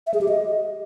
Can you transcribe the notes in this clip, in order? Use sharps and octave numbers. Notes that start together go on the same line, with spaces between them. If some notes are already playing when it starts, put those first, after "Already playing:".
E5
G#4
G4
D#5